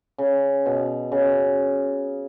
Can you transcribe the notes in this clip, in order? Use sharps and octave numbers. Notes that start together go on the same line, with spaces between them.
C#3
B2
C#3